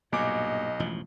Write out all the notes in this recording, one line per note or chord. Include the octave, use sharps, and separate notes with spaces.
B1 G2 A#2 D#5 G#5 D6
E1 A1 F3